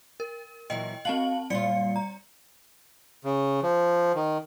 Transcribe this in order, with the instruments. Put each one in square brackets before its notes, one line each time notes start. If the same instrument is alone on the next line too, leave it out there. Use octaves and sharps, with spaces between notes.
[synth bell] A#4
[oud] A#2 E3 F#3 [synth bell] D#5 G5
[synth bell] C4 A5 F#7 [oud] F#4 F5
[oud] F#2 A#2 F4 [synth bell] G3 D5 C#7
[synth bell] A#5
[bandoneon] C#3
F3
D#3